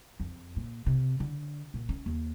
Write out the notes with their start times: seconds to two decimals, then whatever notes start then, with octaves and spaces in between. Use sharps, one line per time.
0.20 F2
0.56 A#2
0.86 C3
1.20 D3
1.74 A#2
1.89 C#4
2.06 D#2